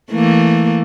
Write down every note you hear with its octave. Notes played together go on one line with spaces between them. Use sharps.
E3 A3 A#3